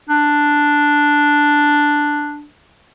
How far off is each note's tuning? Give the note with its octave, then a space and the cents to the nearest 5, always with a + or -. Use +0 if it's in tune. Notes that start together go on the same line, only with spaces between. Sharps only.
D4 +0